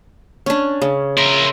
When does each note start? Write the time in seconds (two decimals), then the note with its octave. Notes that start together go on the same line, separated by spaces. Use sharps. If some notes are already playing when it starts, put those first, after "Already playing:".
0.46 C#4 D4
0.82 C#3
1.18 A#4 C5 E5